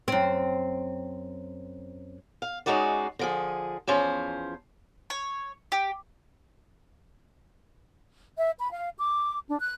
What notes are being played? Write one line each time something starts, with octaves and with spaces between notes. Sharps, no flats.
F#2 C4
F5
G#3 C#4 D#4 F#4 D5
D3 F3 G#4
E2 F3 C#4 C5
C#5
G4
E5
B5
F5
D6
D4
F#6